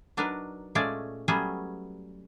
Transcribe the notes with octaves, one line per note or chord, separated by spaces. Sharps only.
F#3 D4 D#4 A#4 B4
A#2 G#3 A3 C#4 G#4 D5
F#3 G3 A3 B3 C#4 G#4